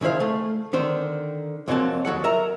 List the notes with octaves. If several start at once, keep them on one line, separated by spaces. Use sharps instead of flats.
C#2 D#3 E4 C5 F5
A3
D3 D#3 C5
F2 E3 F#3 A#3 C4 A5
D#2 F#3 A4 F#5
A#4 E5 A#5